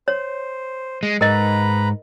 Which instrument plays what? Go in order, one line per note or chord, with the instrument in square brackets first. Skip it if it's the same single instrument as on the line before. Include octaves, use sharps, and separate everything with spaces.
[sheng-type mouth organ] C5 [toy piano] C#5
[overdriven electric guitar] G#3
[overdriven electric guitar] G#2 [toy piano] A#4 D#5 [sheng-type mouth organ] B4 A#5 B5